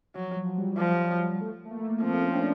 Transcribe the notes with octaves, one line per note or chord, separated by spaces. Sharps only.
F3 F#3
F3
F#3
G3
F3
A3
A3
A#3
F3 C4
C#4
D4